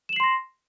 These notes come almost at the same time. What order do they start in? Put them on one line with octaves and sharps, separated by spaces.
E7 F#7 C7 C6 A#6